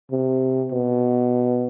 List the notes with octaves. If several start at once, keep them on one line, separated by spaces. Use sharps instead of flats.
C3
B2